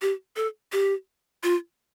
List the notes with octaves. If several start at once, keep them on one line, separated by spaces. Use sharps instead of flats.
G4
A4
G4
F4